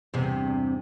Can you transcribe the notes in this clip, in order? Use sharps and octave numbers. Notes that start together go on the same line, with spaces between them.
E2 G2 C3